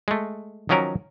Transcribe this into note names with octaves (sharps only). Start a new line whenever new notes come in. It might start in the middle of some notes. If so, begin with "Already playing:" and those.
G#3 A3
D#3 F3 F#3 C#4 A#4